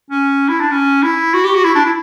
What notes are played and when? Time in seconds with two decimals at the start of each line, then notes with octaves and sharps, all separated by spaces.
0.11 C#4
0.49 E4
0.60 D4
0.72 C#4
1.03 E4
1.34 F#4
1.44 G4
1.54 F#4
1.64 E4
1.75 D4
1.85 E4